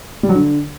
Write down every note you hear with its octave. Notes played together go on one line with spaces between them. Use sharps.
G3
F#3
D3